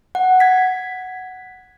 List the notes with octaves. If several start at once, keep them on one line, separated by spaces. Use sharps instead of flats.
F#5
G#6 B6